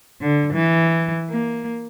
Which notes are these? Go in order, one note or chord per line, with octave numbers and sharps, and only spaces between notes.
D3
E3
A#3